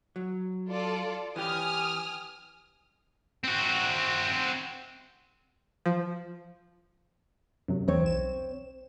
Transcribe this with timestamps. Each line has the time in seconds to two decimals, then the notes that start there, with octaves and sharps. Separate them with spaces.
0.16 F#3
0.69 F4 A4 D5
1.36 E3 G4 G#5 D#6 F6
3.44 C4 F#4
5.86 F3
7.68 F#2 C3 F#3
7.88 E2 C4 C#5
8.04 B1 E7